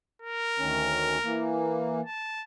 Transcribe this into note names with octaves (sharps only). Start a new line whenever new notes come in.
A#4
D2 D#3 C#4
E3 A#3
A5